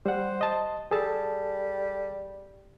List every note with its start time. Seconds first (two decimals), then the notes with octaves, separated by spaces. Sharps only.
0.06 G3 C5 F#5
0.41 D#5 A5
0.91 G3 G#4 A4 A5